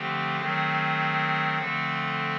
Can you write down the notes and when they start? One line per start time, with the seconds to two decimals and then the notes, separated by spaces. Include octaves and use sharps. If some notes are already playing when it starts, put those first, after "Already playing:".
Already playing: D3 F3 A3 C4 G4
0.40 D#3 F#3 A3 C4 G#4
1.58 D3 F3 A3 C4 A4